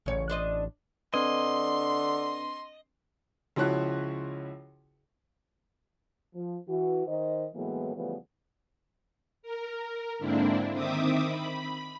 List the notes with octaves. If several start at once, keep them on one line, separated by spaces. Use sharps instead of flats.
A1 C#3 C#5
D4 C5 D#5
D3 C4 D4 B4 D#5 C6
C#2 F3 E4 F#4 C#5 F#6
F3
E3 F#4
D#3 C5 D#5
A2 E3 F#3 G#3 A#3 B3
C#3 E3 F3 G3 A3 B3
A#4
G#2 D3 A#3 C4 D4 E4
D#3 C4 E5 D6 D#6
B5